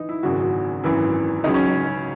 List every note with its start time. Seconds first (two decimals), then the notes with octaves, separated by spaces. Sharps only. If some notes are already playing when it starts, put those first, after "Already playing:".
Already playing: E3 D#4
0.09 E4
0.23 G#1 F#2 C#3 F#4
0.84 G#1 F#2 E3 E4
1.44 C#2 C#3 F#3 D#4
1.54 C#4